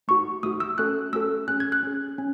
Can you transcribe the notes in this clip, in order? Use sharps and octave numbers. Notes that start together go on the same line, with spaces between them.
A3 D#4 F#4 C#6
A3 D#4 F#4 D#6
E6
A3 C#4 F#4 A4 F#6
A3 C#4 F#4 A4 E6
C#4 G#4 F#6
G#6
F#6
C#4 G#4
C#4